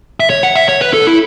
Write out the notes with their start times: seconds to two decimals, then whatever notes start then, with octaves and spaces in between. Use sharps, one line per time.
0.20 E5
0.30 C#5
0.43 F#5
0.56 E5
0.69 C#5
0.81 B4
0.93 A4
1.07 E4